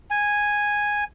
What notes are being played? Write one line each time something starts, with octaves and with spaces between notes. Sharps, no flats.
G#5